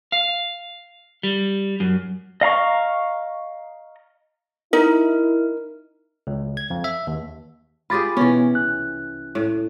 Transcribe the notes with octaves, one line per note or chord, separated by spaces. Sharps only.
F5
G3
F#2
D#5 F5 A#5 C#6
D#4 E4 A#4
C#2
G#6
F2
E5
D#2
F4 G4 G#4 B5 A6
B2 E3 B3 C#4
C2 F#6
A2